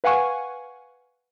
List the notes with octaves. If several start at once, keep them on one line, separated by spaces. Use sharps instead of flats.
B4 F5 F#5 G#5 C#6